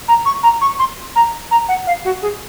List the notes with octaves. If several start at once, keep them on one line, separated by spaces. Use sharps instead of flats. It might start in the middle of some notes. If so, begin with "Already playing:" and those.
A#5
C#6
A#5
C#6
C6
A#5
A#5
F#5
F5
F#4
G#4